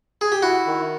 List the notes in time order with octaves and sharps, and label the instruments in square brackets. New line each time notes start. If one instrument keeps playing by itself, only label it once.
[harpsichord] G#4
G4
[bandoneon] E4 [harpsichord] F#4
[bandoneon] D#3